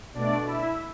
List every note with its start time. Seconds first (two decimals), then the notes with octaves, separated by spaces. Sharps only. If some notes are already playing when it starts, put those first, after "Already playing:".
0.14 B2 A3 D4 D5
0.46 E4 E5